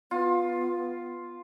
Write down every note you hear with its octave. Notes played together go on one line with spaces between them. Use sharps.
B3 F4